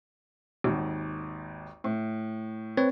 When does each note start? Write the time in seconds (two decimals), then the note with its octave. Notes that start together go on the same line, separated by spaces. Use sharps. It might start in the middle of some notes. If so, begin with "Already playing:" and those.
0.64 G#1 D#2
1.84 A2
2.77 C4 B4 C#5